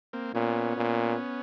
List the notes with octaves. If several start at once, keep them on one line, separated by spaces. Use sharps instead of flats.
A#3 C4
A#2 B3 C#4
A#2